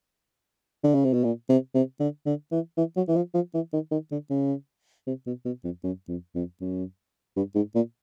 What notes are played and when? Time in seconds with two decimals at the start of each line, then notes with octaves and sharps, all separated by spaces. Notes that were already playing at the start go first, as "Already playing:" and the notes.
0.84 D3
0.94 C#3
1.05 C3
1.13 B2
1.24 A#2
1.49 C3
1.74 C3
2.00 D3
2.26 D3
2.51 E3
2.77 E3
2.96 F#3
3.08 E3
3.16 F3
3.34 F3
3.54 E3
3.73 D#3
3.91 D#3
4.11 D3
4.30 C#3
5.07 C3
5.27 B2
5.45 B2
5.64 F2
5.84 F#2
6.08 F2
6.35 F2
6.61 F#2
7.36 G2
7.55 G#2
7.75 A#2